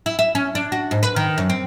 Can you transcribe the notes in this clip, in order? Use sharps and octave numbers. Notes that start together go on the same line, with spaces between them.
E4
E5
C#4
D4
F#4
G#2
B4
D#3
F#2
C4